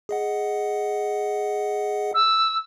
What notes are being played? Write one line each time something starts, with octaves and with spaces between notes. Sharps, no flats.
G#4 D#5 F#5
E6